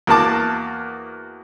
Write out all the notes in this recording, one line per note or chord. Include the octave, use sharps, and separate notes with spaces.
E2 A#3 F#4 A5 D6